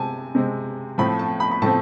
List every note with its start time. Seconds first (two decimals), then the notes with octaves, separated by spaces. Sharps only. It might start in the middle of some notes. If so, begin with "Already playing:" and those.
Already playing: C3 G#3 C4 G#5 A5
0.35 C3 G#3 C4
0.98 A2 F3 A3 C4 B5
1.19 A5
1.40 B5
1.51 B5
1.62 A2 F3 A3 C4 A5